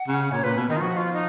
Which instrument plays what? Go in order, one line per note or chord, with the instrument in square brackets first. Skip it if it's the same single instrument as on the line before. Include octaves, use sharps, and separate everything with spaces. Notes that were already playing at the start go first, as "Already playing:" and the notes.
Already playing: [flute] F#5
[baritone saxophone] C#3
[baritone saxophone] A#2 [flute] C#5
[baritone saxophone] A#2 [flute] B4
[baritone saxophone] B2
[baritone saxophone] D#3 [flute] D#4
[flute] F4
[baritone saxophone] F3 [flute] F#4
[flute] F4
D#4